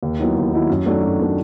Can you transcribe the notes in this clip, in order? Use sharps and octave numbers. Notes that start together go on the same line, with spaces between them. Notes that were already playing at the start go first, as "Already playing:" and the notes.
D#2
D#3 F#3 B3 E4
D#2
D#3 F#3 B3 E4
F#2
D#3 F#3 A3 D4
F#2
D#3 F#3 A3 D4